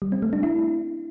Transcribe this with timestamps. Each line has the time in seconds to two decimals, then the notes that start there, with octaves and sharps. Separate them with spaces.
0.02 G3
0.12 C4
0.22 A3
0.33 D4
0.43 E4